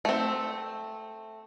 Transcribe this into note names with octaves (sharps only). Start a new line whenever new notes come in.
A3 C4